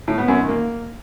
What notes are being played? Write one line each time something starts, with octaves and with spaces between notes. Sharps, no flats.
A2
B3
F#2
D#3
A#3